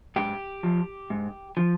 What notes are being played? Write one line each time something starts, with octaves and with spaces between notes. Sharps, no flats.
G#2 G4
F3
G#2
F3